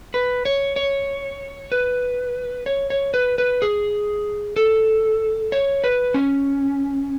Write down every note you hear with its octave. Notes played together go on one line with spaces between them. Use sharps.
B4
C#5
C#5
B4
C#5
C#5
B4
B4
G#4
A4
C#5
B4
C#4